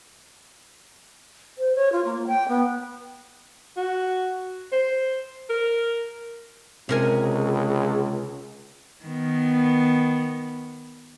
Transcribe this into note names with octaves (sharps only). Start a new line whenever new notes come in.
C5
C#5
F4
A#3
G5
B3
F#4
C5
A#4
C#2 C3 G#4 A#4 G#5
D#3 B3